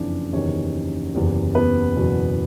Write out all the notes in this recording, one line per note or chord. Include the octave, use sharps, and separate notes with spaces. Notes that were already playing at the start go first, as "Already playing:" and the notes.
Already playing: F#1 F2 C#3 E3 D4
F#1 E2 C3 D#3 C#4 C#5
F#1 E2 C3
B3 B4
F#1 E2 B2 F#3